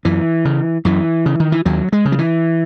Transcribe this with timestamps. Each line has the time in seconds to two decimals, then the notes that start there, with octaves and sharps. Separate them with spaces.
0.05 F#2 E3
0.45 C#3
0.85 F#2 E3
1.26 C#3
1.40 D#3
1.52 E3
1.65 D#2 F#3
1.92 G#3
2.05 C#3
2.12 F#3
2.18 E3